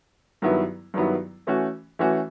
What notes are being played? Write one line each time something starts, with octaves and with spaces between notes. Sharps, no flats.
G2 D#3 F#3 B3 E4
G2 D#3 F#3 B3 E4
E3 A3 C#4 F#4
E3 A3 C#4 F#4